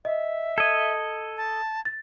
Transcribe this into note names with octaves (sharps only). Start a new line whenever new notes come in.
D#5 E5
A4 D#5 G#6
A5
A6